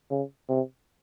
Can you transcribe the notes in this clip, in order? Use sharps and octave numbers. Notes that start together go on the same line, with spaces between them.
C#3
C3